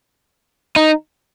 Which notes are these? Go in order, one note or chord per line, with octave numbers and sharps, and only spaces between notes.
D#4